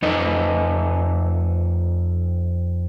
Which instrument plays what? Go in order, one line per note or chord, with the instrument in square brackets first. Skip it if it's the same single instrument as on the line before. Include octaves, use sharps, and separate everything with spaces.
[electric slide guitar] F2 D#4 A4 B4 D#5